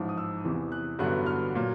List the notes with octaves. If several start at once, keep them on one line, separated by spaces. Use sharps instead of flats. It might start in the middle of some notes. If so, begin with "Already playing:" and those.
Already playing: A1 G#2 F3
D#6
E6
E2 C3 E3
F#6
A1 G2 D3 F#3 B3 F#6
F6
A#2 F#3